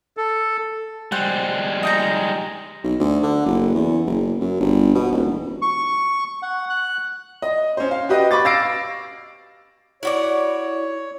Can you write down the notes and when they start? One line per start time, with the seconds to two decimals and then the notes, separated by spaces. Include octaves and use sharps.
0.17 A4
1.12 G3 G#3 C5 F#5
1.83 D#4 G5 A#5
2.84 B1
3.00 D2
3.23 D3
3.46 F#1
3.75 E2
4.06 F#1
4.41 F#2
4.60 G1
4.95 B2
5.12 D#1
5.26 E1
5.62 C#6
6.42 F#5
6.70 F#6
7.42 D#5
7.77 C#4 C5
7.91 F5
8.09 F#4 G4 B4 D#5
8.31 B5 C#6 D6 A6
8.45 F5 E6 A6 A#6 C7 D7
10.03 E4 F#4 C#5 D5